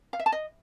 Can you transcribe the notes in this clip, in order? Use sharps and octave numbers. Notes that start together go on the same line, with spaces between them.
F5
E5
A5
D#5